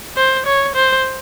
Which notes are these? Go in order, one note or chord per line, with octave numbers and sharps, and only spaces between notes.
C5
C#5
C5